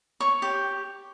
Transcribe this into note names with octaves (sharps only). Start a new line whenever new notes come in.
C#5 C#6
G4